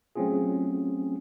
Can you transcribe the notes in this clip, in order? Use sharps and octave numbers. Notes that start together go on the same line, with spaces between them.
F#3 A3 C4 C#4 F4 G#4